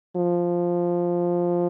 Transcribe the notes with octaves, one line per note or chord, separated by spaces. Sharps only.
F3